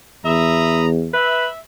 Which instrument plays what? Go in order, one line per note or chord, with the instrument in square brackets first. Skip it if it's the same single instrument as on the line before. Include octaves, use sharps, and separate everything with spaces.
[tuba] E2 [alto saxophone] E5 [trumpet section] A#5 B5 D#6
[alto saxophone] B4 [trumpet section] E5